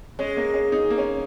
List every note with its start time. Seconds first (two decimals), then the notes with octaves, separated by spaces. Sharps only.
0.19 G#3 C#4
0.37 A#3
0.54 C#4
0.72 D#4
0.90 A#3
0.98 C#4